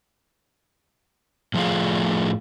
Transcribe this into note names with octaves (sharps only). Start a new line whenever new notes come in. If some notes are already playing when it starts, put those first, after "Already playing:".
A2 F3 A3 F4 G#4 F5